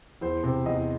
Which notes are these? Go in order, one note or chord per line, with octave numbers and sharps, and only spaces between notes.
E2 C5
C3
E2 D#5